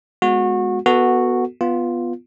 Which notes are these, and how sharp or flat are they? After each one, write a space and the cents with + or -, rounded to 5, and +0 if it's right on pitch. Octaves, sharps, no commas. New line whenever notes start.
G#3 +0 B3 +0 F#4 -25
B3 +0 F#4 -5 A4 +20
B3 +0 F4 +0